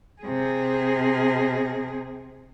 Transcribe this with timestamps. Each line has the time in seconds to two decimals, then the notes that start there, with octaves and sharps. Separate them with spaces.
0.22 C3 G#4